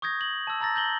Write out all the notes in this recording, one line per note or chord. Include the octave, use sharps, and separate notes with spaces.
C#6 D#6 G6 G#6 A#6
F#7
A5 E6
A5 A#5 E6 A6 A#6
G6 A#6 F#7 G7